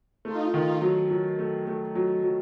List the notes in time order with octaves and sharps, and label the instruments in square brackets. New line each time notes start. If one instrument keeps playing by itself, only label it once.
[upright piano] A3 [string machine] D#4 F4
[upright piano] D#3 [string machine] D#4 F4
[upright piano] F#3
F#3
A3
A3
F#3
F#3